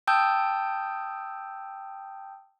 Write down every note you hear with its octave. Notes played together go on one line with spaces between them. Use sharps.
G5 A5 D#6 E6 G6